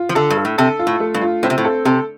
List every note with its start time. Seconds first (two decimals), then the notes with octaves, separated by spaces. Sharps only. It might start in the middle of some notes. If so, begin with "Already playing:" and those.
Already playing: F4
0.09 F3
0.15 D3 A4
0.30 G2
0.36 A4
0.45 A2
0.58 C3 A4
0.79 F4
0.87 A2
1.00 A3
1.14 G2
1.21 F4
1.43 A2 C4
1.50 C3
1.58 A2
1.65 A4
1.85 C3 A4